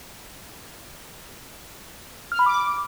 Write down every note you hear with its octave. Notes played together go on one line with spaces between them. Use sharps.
F6
B5
D6